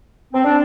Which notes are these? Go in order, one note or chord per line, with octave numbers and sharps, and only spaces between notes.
C4
D4